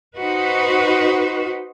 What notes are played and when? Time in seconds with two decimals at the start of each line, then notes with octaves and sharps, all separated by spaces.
0.18 D#4 F#4 B4 C5